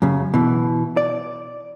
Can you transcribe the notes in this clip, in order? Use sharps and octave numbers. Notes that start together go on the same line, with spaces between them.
F#2 C#3
B2 E3
D5